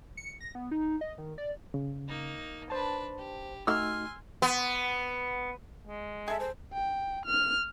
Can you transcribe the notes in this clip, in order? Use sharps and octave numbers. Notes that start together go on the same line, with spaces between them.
C#7
A#6
B3
D#4
D#5
D#3
D5
C#3
A#3 D#4
D4 B4 C5 A5
G4
A3 D#4 F#4 G#5 C6 E6 F6
B3
G#3
G#4 A4 E5
C5
G5
F6